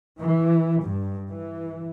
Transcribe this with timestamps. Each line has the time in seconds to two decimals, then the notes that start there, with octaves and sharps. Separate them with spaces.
0.19 E3
0.80 G2
1.30 E3